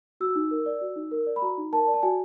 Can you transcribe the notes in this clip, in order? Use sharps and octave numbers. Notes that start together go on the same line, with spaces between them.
F#4 E6
D#4
A#4
D5
F#4
D#4
A#4
D5
B5
F#4 A#5
D#4
A#4 A5
D5
A5
F#4 G#5